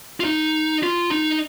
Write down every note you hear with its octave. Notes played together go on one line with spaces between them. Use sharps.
F4
D#4
F4
D#4